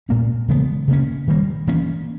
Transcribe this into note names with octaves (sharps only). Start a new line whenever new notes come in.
A#2 A#3 C#4
C#3 E3 G#3 B3
C#3 G3 A#3 C#4
D#3 G3 A#3
E3 A#3 C#4